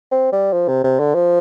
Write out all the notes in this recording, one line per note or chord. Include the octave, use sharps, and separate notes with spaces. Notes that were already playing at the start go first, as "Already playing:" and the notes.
C4
G3
F3
C3
C3
D3
F3